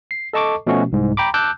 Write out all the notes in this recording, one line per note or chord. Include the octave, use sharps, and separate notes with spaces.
C7
A4 D#5 A5 C#6 D6
B2 F3 A3 C#4 F#4
C2 G#2
G5 A#5 B5 D6
A5 D6 E6 F#6 G6